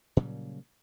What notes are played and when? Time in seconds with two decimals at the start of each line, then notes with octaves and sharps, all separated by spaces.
0.17 A#2 C#3 F#3 G3